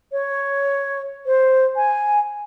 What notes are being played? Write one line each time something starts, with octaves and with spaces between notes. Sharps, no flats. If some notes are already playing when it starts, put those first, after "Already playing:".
C#5
C5
G#5